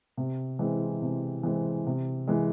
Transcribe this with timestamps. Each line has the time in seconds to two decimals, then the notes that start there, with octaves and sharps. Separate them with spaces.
0.17 C3
0.59 E3 G#3 C4
1.02 C3
1.43 E3 G#3 C4
1.87 C3
2.28 E3 G#3